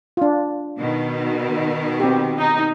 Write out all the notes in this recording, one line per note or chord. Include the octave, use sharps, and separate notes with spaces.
D4 F4
B2 D#3
C4 G4
D#4